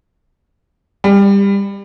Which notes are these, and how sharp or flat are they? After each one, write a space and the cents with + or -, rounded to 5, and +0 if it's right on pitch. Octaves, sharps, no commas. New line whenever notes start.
G3 +25